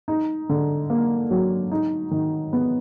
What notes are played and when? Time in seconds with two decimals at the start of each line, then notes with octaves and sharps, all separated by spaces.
0.08 D#4
0.49 D3
0.90 A#3
1.31 F#3
1.71 D#4
2.11 D#3
2.53 B3